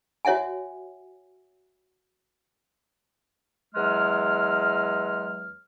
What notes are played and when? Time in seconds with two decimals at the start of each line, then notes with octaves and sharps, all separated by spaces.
0.25 F#4 C#5 E5 F#5 G#5
3.75 E2 F#3 G#3 F6